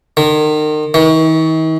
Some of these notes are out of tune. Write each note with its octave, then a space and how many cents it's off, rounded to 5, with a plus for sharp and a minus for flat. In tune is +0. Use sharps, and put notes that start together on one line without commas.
D#3 -35
D#3 +45